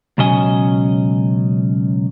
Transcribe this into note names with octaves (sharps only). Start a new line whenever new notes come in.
C#2 B2 F#3 C#4 D#5 G#5